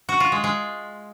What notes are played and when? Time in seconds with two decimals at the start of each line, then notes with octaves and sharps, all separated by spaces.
0.09 F#4
0.20 F4
0.32 G#3
0.44 G#3